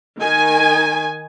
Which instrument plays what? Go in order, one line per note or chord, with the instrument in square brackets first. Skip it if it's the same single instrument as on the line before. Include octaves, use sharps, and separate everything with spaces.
[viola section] D#3 G#5